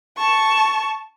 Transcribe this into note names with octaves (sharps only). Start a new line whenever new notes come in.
A5 C#6